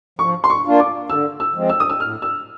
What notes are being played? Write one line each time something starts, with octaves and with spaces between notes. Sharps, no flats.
F3 C#6
C6
C#6
A#3 D4 F4
D6
D3 E6
E6
F3 G#3 C4
E6
D#6
E6
A2 F6
E6